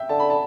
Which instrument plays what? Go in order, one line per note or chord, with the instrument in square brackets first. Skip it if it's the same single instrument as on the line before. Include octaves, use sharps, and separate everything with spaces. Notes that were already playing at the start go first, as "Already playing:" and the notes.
Already playing: [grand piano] E5 G5
[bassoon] D3 [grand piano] A5
[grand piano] B5
A5